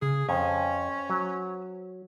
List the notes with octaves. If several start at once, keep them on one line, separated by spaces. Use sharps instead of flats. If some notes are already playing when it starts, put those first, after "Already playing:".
C#3 G#4
F2 C#4 C5 G#5
F#3